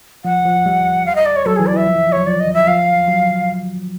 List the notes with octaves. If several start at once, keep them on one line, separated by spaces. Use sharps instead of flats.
F3 F#5
F3
G3
F5
D#5
D5
C#5
F#3 A4
E3 G#4
D5
E3 E5
F3
E3
F3
F#3 C#5
F3 D5
D#5
E3
E5
F3 F5
F#3
F#3